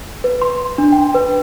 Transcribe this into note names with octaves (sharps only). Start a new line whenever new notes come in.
B4
C6
D4
G5
B4